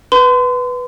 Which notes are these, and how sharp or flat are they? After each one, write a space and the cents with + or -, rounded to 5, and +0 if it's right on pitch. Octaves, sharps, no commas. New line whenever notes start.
B4 +0 C6 -35